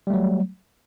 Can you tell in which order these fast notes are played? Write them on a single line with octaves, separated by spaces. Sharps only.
G3 A3 F#3